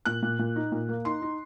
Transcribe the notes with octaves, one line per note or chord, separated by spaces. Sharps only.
A#2 F#6
A#2
A#2
D#4
A#2
A#3
D#4 C6
D#4